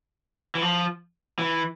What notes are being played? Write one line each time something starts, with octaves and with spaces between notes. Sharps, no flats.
E3
F3
E3